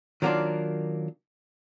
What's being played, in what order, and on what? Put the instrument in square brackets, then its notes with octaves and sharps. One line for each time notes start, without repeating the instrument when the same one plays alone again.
[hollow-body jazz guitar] D#3 F#3 A#3 B3 D4 F4